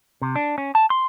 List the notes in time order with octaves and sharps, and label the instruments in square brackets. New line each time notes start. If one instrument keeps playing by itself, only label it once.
[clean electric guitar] C3
D4
C#4
A5
C6